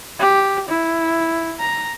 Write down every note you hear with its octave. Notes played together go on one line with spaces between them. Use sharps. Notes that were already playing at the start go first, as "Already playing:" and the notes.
G4
E4
A#5